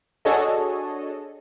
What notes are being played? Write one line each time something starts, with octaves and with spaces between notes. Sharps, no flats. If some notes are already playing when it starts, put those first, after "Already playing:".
D4 F#4 G#4 A4 C#5 D#5